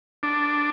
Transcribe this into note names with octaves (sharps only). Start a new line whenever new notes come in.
D4